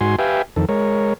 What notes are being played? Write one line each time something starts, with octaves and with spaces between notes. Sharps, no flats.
G#2 F#4 G#5 C6
G4 B4 E5 F5 G5 G#5
F2 D#3 A4
G#3 A#4 C#5